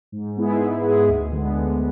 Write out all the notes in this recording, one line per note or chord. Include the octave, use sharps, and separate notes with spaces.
G#2
G#3 B3 E4 G#4
G#2
G#3 B3 E4 G#4
D2
D3 G#3 B3
D2